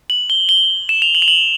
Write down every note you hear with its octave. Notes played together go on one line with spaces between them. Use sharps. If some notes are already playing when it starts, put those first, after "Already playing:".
F#7
G7
G7
E7
F7
F#7
F7
F#7